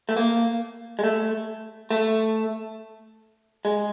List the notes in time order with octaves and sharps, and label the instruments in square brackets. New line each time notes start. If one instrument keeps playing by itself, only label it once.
[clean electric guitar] A3
A#3
G#3
A3
A3
G#3